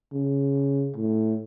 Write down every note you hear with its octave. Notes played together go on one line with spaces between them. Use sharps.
C#3
A2